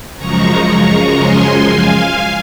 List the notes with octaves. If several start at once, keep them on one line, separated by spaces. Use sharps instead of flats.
F#2 C#3 F3 G#3 A#5 C#6
G#5 C6
F5 G#5